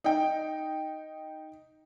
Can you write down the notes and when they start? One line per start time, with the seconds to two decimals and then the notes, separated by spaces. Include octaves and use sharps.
0.04 D#4 G5